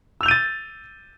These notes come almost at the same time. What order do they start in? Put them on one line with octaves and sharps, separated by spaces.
E6 F7 G6 D#7 A6